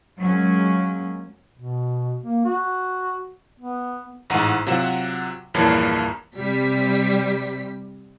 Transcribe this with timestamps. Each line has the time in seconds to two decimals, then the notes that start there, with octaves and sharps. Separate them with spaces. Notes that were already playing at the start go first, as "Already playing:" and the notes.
0.18 F#3 G#3 A#3 C#4
1.56 B2
2.22 A#3
2.45 F#4
3.60 B3
4.30 A1 G#2 F#5 A#5 D#7
4.66 C3 F#3 F4 F#5 E7
5.54 A#1 E2 G2 A#3 C#5 A5
6.35 C3 G3 B6